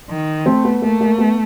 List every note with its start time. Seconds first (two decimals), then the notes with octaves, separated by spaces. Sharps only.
0.10 D#3
0.46 A3 C4
0.65 B3
0.82 A3 A#3
1.01 A#3
1.18 B3